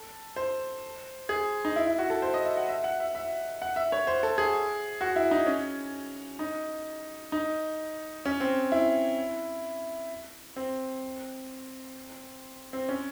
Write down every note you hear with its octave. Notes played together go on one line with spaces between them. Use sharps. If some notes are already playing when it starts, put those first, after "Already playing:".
Already playing: A4
C5
G#4
D#4
E4
E4
F#4
A4
C5
D#5
E5
F#5
E5
F#5
E5
E5
F#5
E5
C#5
C5
A4
G#4
F#4
E4
D#4
C#4
D#4
D#4
C#4
C4
E4
C4
C4
C#4